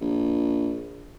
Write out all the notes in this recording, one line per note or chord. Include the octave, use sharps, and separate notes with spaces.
A#1